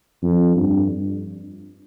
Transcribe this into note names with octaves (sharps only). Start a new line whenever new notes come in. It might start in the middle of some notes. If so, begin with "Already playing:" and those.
F2
G2